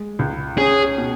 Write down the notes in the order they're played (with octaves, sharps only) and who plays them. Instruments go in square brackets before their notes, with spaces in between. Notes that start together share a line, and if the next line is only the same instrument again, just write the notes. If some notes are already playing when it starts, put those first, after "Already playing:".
Already playing: [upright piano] G#3
C#2
[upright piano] C#4 [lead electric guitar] G#4
[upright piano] B2